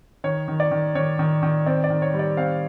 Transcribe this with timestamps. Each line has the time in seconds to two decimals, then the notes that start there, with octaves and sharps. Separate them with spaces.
0.24 D#3 C#5
0.48 D#3
0.60 D5
0.71 D#3
0.95 D#3 C#5
1.19 D#3
1.43 D#3
1.66 C4 D5
1.84 D5
1.90 D#3
2.02 C#5
2.14 G3
2.19 D5
2.37 C4 F5